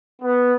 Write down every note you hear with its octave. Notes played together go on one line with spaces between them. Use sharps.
B3